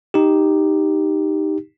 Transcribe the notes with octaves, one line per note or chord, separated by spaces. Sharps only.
D#4 G4